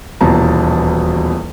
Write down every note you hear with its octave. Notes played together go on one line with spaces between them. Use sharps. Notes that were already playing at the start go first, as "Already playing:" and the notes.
D#1 E2 B2 A5 A#5